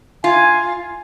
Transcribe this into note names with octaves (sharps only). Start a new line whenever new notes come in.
F4 G#5